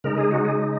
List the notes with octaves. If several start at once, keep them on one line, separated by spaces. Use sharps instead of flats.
C#3 G#3 D#4 A#4
G#4
F#4
G#4